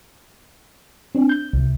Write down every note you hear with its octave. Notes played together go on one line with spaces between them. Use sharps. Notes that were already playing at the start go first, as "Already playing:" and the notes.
C4 D4
G6
C2